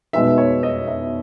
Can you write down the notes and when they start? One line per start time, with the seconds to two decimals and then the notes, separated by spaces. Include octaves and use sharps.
0.13 B2 G#3 B3 D#4 E5
0.38 C#5
0.63 D#5
0.87 E5